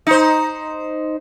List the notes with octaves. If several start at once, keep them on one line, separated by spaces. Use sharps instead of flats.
D#4 C5